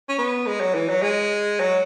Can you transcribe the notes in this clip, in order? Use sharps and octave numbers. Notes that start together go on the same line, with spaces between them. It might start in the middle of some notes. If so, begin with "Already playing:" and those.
C#4
B3
G#3
F#3
E3
F#3
G#3
F#3